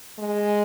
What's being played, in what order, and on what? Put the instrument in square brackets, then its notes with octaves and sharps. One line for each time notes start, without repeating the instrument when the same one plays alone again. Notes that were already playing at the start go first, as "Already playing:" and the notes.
[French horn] G#3